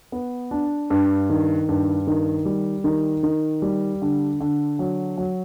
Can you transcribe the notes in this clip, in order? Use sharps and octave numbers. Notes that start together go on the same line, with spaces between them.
B3
D4
G2
D#3
G2
D#3
G3
D#3
D#3
G3
D3
D3
F#3
F#3